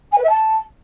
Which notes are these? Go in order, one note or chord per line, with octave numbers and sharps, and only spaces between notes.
G#5
B4
E5
A5